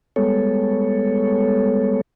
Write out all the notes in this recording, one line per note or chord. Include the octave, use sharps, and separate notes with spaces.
G3 G#3 B3 A4 C#5